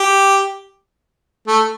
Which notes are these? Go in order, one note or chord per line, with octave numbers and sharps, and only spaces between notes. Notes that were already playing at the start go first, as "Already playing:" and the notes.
Already playing: G4
A3